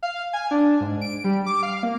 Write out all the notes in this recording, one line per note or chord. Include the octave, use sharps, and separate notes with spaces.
F5
G#5
D4
G#2
D7
G3
D6
F5
A#3